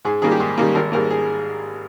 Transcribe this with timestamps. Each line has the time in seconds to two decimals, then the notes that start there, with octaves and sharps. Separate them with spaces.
0.05 G#2 G#4
0.22 D#3 G3 A#3 G#4
0.31 G4
0.40 G#2 G#4
0.58 D#3 G3 A#3
0.75 G#1 A#4
0.92 G#2 G3 A#3 A#4
1.10 G#4